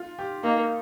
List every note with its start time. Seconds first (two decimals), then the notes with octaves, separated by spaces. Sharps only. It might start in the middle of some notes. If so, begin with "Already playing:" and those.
Already playing: F4
0.19 G4
0.43 A#3 D#4